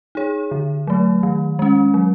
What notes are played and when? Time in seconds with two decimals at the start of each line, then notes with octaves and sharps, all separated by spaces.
0.15 D#4 G#4 C#5
0.51 D3
0.87 F#3 A3
1.23 D#3
1.59 G#3 C#4
1.94 F#3